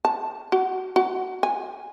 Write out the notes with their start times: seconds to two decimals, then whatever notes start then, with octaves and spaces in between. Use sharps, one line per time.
0.05 A5
0.52 F#4
0.96 F#4
1.43 G#5